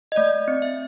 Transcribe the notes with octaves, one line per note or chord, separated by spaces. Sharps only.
D#5
A3 D5
C4
E5